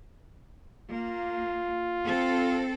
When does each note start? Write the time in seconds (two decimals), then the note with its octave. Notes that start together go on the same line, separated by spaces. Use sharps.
0.91 A#3 F4
2.06 C4 A4